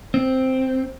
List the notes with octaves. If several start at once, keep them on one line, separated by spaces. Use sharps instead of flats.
C4